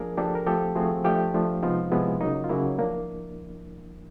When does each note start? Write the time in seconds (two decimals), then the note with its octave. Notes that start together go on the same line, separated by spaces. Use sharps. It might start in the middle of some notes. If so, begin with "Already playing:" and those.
Already playing: F3 A#3 D4 G#4 A#4
0.17 F3 A#3 D4 G4 A4
0.35 A#4
0.46 F3 A3 C4 G4 A4
0.75 F3 A3 C4 F#4 G#4
1.04 F3 A3 D4 F4 G4
1.34 F3 A3 D4
1.63 C3 F3 G#3 B3 D#4 F4
1.92 C3 F3 G#3 B3 E4
2.21 C#3 F#3 A#3 D#4
2.44 F4
2.49 C#3 F#3 A#3 E4
2.79 F3 A#3 D4